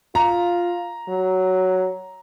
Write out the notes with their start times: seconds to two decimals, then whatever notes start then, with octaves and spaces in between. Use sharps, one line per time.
0.15 F4 A#5
1.08 F#3